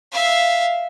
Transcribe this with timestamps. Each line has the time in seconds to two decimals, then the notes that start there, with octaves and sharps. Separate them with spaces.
0.12 E5 F5